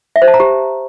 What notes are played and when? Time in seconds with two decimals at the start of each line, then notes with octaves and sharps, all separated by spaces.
0.16 E5
0.22 C5
0.28 A5
0.34 A#5
0.40 G4